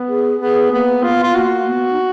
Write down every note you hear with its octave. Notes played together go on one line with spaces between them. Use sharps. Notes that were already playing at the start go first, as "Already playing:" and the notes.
Already playing: B3
G#4
B3 G#4
A#3 B3
B3 F4
F4
A#3 F#4
B3
D#4